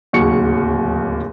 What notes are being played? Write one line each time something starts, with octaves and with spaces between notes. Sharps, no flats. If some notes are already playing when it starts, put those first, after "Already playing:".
D1 D#2 C#3 F#3 C#6 C#7